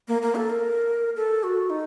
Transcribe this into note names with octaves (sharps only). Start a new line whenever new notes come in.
A#3
A#3
A4
A#4
A4
F#4
D#4